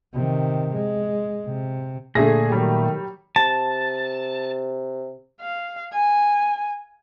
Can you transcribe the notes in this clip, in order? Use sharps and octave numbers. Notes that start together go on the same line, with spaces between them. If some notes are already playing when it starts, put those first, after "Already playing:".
C3 D#3
G#3
C3
A#2 D3 A3 G#4 E5 A#6
D#3 F#3 G3 G4
C3 A5
F5
G#5